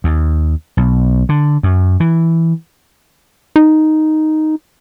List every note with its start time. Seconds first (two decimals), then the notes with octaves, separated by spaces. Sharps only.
0.04 D#2
0.77 B1
1.29 D3
1.63 F#2
2.00 E3
3.56 D#4